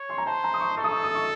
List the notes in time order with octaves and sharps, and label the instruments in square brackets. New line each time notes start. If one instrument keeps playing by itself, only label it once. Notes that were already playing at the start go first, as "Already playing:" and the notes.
Already playing: [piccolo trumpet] C#5
[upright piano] C6
A#5
[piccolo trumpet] C5 [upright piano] A5
[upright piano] A#5
D#6
C#6
[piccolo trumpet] A4 [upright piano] C#6
[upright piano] D#6
C#6
D#6
C#6